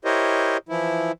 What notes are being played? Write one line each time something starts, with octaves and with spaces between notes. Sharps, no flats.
E4 G4 A#4 C5 C#5 D#5
E3 F3 E4